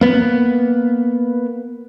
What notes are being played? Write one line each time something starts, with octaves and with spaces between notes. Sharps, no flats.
A#3 B3